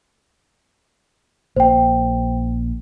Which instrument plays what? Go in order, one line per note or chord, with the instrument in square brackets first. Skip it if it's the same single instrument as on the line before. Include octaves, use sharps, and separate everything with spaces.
[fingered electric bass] A#1 A#3 [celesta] C5 G5